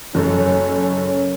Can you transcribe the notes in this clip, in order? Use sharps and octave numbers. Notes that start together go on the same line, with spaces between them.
F#1 F#2 C#4 A4